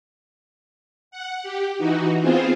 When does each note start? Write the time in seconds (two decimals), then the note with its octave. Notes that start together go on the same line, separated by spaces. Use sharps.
1.11 F#5
1.43 G4
1.78 E3 D#4 F#4
2.21 B3 C4 F4 G#4 C5